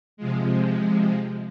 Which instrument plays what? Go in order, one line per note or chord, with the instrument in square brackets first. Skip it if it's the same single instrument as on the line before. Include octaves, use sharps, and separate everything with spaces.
[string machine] C3 F3 G#3